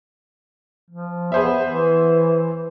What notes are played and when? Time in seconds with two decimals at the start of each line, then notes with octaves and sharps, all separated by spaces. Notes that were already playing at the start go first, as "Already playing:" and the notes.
0.90 F3
1.32 B3 G#4 C5 E5
1.66 E3